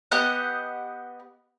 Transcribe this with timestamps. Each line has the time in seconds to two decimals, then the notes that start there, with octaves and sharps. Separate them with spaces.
0.11 B3 G4 D#5 F#5